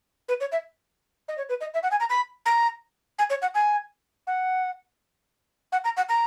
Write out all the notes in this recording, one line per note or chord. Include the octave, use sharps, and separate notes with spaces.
B4
C#5
E5
D#5
C#5
B4
D#5
E5
F#5
G#5
A#5
B5
A#5
G#5
C#5
F#5
G#5
F#5
F#5
A#5
F#5
A#5